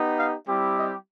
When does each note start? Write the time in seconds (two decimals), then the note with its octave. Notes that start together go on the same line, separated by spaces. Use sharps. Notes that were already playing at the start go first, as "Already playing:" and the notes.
Already playing: B3 D#4 G4
0.18 F5
0.47 G3 C4 E4 G4
0.77 D#5